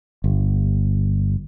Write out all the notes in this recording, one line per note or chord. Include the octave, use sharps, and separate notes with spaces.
G1